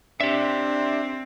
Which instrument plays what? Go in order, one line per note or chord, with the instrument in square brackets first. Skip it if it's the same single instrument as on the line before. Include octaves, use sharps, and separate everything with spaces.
[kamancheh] C4 [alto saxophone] D4 [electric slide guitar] G4 E5